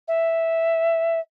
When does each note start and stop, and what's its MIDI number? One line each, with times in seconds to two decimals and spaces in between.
0.08 1.19 76